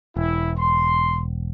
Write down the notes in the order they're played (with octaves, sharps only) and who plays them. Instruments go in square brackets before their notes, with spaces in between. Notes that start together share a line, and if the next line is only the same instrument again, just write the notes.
[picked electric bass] E1 [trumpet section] E4
[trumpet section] C6